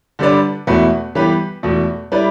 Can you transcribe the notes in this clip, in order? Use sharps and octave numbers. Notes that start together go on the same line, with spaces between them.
D3 G3 D4 B4 D5
E2 B2 A3 E4 B4
E3 G3 B3 G4 B4
E2 B2 A3
G3 E4 B4 D5